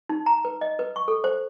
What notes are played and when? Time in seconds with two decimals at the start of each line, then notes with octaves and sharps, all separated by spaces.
0.09 D#4
0.26 A#5
0.45 B4
0.61 D#5
0.79 B4
0.96 C#6
1.08 A4
1.24 C5